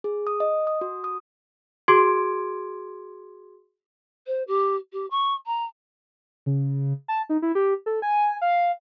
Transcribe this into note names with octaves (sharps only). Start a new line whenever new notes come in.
G#4
D#6
D#5
D#6
F#4
D#6
F#4 G#4 C6 D6 G#6 D7
C5
G4
G4
C#6
A#5
C#3
A5
D#4
E4
G4
A4
G#5
F5